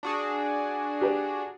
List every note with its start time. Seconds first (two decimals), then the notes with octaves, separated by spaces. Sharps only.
0.03 D4 F#4 G#4
1.01 G4 B4